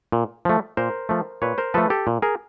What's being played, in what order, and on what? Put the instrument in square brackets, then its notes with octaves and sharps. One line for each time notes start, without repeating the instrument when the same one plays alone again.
[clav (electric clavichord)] A#2
F3 A3
A#2 A#4 C5
F3 A3
A#2 B4 C#5
A#4 C5
F3 A3 A4 B4
G4 A4
A#2
G#4 A#4